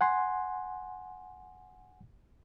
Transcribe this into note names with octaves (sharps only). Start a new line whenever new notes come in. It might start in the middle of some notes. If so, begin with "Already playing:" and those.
F#5 G#5 C6